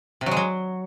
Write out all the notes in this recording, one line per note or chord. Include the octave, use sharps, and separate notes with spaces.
C3
F#3
G#3
F#3